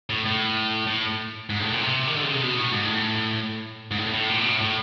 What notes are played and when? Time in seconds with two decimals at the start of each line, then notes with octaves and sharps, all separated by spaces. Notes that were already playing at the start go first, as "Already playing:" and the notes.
0.10 A2
0.26 A2
0.87 A2
1.50 G#2
1.60 A2
1.70 A#2
1.81 C3
2.07 D#3
2.16 D3
2.24 C#3
2.34 C3
2.42 B2
2.58 A2
2.72 G#2
2.85 A2
3.91 G#2
3.98 A2
4.14 A2
4.29 A#2
4.40 B2
4.50 A2
4.60 A2